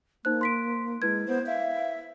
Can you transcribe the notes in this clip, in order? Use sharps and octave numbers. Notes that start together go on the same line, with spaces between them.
A#3 D#4 C5 F#6
C6 B6 D7
G#3 E4 B4 G#6
B3 C5
E5 F5